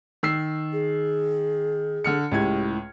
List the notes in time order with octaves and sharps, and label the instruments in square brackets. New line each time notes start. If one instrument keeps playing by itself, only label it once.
[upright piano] D#3 E6 C7
[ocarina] G#4
[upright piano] D3 F6 C#7
[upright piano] C#2 A2 G#6 [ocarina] G4